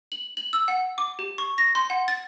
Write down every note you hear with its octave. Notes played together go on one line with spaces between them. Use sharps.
F#7
F#7
E6
F#5
D6
G4
C#6
A#6
C6
F#5
A6